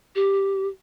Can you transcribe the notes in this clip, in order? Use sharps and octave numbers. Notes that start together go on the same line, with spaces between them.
G4